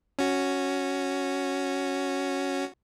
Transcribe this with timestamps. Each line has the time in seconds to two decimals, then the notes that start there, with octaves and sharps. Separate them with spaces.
0.19 C#4 F#4